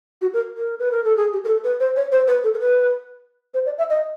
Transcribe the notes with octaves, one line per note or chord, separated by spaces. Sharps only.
F#4
A#4
A#4
B4
A#4
A4
G#4
G4
A#4
A4
B4
C5
C#5
C5
B4
A4
A#4
B4
C5
D5
E5
D#5